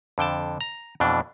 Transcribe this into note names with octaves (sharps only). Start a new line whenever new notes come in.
F2 D3 G5 A5
A#5
F2 B2 E3 D4